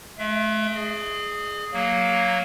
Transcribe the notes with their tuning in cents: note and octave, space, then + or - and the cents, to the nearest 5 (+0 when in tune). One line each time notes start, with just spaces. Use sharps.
A3 -45 E5 +30
G#4 +0 D#5 -45
F#3 +0 A#3 +0